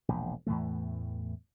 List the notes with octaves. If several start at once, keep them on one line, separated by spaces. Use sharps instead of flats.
E1 A#1
E2 A2 E3 A3